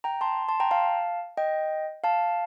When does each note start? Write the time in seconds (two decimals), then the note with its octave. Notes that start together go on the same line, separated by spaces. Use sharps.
0.04 G5 A#5
0.21 A5 C6
0.48 A5 C6
0.60 G5 A#5
0.71 F5 A5
1.37 D#5 G5
2.04 F5 A5